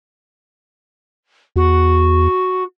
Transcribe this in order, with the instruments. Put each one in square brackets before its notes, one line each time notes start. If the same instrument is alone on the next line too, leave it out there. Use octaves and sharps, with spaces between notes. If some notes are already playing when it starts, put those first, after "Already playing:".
[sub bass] E2 [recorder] F#4